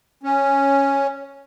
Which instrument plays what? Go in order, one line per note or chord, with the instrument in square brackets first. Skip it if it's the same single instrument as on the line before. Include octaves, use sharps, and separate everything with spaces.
[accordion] C#4